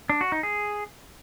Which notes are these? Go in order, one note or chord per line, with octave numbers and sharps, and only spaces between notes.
D4
F#4
D#4
G#4